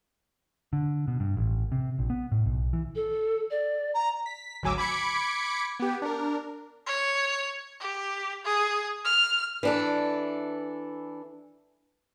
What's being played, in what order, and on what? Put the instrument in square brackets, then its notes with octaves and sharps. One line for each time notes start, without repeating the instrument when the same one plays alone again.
[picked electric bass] D3
B2
G2
A1
C3
A#1
B3
A2
B1
E3
[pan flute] A4
D5
[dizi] A#5
[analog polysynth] B6
G#1 D2 F#3 G#5 D6 E6
B5 D6 G#6 B6 C#7 D7
B3 G4
D4 A#4
[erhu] C#5
G4
G#4
F6
[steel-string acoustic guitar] E3 D4 A4